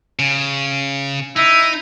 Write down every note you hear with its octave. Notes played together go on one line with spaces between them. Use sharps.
C#3
D#4 E4